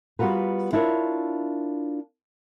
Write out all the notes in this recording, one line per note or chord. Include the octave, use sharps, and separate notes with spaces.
G3 B3 F4 F#4 A#4 B4
D4 E4 F4 A#4 C#5